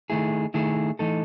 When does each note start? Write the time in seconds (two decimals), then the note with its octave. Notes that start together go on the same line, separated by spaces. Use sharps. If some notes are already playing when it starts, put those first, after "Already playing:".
0.10 D#3 A3 E4 G#4
0.54 D#3 A3 E4 G#4
0.99 E3 A3 D#4 A4